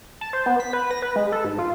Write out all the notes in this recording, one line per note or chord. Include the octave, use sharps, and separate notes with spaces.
A5
C5
B3
B6
B4
A#6
B4
G#3
A4
G#2
F4